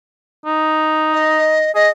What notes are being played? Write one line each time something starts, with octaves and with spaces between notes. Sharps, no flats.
D#4
D#5
G#4 D#5